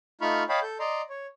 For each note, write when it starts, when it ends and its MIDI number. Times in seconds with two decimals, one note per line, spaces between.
0.21 0.44 57
0.21 0.44 63
0.21 0.44 65
0.21 0.44 83
0.21 0.44 85
0.21 0.44 89
0.49 0.60 73
0.49 0.60 75
0.49 0.60 77
0.49 0.60 79
0.49 0.60 81
0.49 0.60 83
0.62 0.78 69
0.62 0.78 91
0.80 1.02 74
0.80 1.02 75
0.80 1.02 82
0.80 1.02 84
1.09 1.26 73